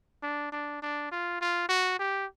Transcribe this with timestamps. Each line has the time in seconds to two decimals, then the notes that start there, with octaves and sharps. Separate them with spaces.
0.23 D4
0.52 D4
0.82 D4
1.12 F4
1.41 F4
1.69 F#4
1.99 G4